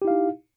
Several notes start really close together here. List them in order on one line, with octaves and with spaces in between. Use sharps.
G4 E4 F5 D#4